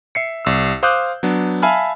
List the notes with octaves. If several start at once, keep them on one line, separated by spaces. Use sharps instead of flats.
E5 C7 C#7
C2 E6
C5 F5 D6 D#6 F#6 G6
F#3 B3 D4
E5 F5 G#5 A5 B5 F6